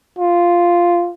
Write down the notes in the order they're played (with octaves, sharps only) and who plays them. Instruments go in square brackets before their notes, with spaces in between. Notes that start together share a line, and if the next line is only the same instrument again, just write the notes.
[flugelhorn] F4